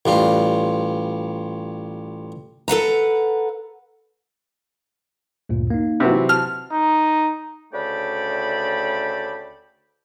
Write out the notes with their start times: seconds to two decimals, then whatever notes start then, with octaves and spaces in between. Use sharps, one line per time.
0.06 A1 G3 F4
2.68 A4 B4 F#5 A#5
5.49 D2 G2 A#2
5.70 A#3 D#4
6.00 C3 E3 F#3
6.29 A5 F6
6.72 D#4
7.74 D2 C#3 A3 D5 G5 B5